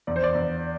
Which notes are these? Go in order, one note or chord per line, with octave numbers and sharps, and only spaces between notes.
E2 D5
C5
D5
E2